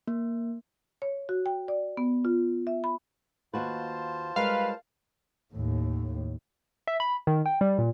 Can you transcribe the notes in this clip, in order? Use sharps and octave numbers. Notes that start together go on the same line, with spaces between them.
A#3
C#5
F#4
G5
D5
B3
F4
E5
B5
D#2 F4 F#4 B4 C5 A5
G3 G#3 A#4 B4 F5
D#2 A2
E5
B5
D#3
G5
G3
A#2